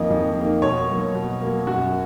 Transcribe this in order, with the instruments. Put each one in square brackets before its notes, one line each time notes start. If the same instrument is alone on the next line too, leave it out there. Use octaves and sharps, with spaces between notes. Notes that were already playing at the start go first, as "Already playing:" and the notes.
Already playing: [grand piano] F2 D#3 A#3 D#5
F2
D#3 A#3
B2 C#5
F#3 A#3
B2
F#3 A#3
F#2 F#4